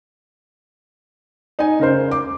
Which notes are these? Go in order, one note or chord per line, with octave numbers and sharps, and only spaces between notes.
D#4 G#5
C#3 A#4 C5
D6